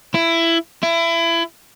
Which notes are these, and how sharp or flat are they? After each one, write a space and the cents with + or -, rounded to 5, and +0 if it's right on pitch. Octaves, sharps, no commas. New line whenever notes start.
E4 +15
E4 +25